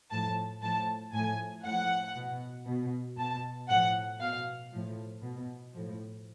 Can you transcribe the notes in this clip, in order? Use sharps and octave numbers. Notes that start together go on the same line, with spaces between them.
A2 F3 A5
A2 F3 A5
A2 F3 G#5
A2 F3 F#5
B2
B2
B2 A5
A2 F3 F#5
B2 F5
A2 F3
B2
A2 F3